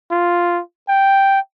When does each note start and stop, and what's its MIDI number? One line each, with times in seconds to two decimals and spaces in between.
0.11 0.61 65
0.88 1.40 79